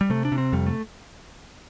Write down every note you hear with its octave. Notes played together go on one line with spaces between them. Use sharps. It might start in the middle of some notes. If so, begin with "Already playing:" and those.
G3
C3 A3
D4
C3
C4
F2 G3
A3